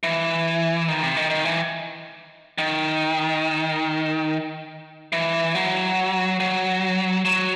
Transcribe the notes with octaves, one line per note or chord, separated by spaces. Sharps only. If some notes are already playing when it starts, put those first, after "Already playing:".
E3
D#3
C3
D#3
D#3
E3
D#3
E3
F#3
F#3
F#3